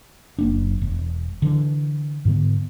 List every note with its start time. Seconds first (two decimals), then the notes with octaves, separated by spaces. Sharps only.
0.38 F#1 A#3 D4
0.82 E1
1.42 D3 E3
2.25 G#2 D3 B3